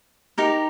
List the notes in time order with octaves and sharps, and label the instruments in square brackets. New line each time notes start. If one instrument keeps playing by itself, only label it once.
[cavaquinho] D#4 G4 A#4